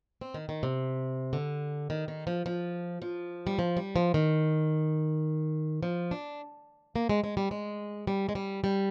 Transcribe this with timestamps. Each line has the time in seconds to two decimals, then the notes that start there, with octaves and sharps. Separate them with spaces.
0.21 C4
0.34 D#3
0.49 D#3
0.63 C3
1.33 D3
1.90 D#3
2.08 D#3
2.27 F3
2.46 F3
3.02 F3
3.47 G3
3.59 F3
3.77 G3
3.96 F3
4.14 D#3
5.83 F3
6.11 D4
6.96 A#3
7.09 G#3
7.24 G#3
7.37 G3
7.51 G#3
8.07 G3
8.29 G#3
8.35 G3
8.64 G3